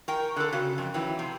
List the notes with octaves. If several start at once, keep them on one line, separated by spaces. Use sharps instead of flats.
A#4 G5 C#6
D3 A4 F#6
C#3 F#4
F2 G5
E3 F#3 G5
C3